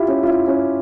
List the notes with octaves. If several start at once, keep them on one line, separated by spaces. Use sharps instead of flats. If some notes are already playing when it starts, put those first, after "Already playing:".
Already playing: E4 F4 G4
C#4
F4
E4
C#4